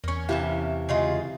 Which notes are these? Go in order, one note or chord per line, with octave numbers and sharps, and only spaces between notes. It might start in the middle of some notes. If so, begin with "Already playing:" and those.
E2 A#3 C#4 C#6
C3 E3 E4 G4 F5 A5
C#3 G#3 F4